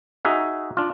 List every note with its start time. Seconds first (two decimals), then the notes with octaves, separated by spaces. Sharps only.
0.25 D#4 F#4 G#4 E5
0.77 D4 F4